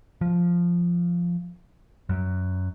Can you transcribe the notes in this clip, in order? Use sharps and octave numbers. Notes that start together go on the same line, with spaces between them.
F3
F#2